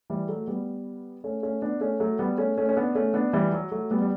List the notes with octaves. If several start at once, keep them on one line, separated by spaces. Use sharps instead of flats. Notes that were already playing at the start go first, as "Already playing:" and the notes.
E3 G3
F#3 A3
G3 B3
A3 C#4
A3 C#4
B3 D4
A3 C#4
F#3 A3
G3 B3
A3 C#4
A3 C#4
C#4
B3 D4
A3 C#4
B3 D4
E3 G3
F#3
F#3 A3
G3 B3
G3